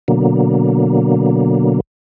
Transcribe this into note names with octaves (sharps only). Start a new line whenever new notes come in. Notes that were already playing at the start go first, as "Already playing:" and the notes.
B2 D3 F#3 A#3